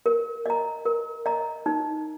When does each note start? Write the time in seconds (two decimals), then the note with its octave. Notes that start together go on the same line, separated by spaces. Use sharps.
0.06 A#4
0.46 D#5 A#5
0.85 A#4
1.26 D#5 A#5
1.66 D#4